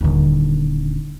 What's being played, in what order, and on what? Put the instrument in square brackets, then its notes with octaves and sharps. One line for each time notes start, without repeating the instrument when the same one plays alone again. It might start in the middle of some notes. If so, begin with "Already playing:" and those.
[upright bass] D#1 D3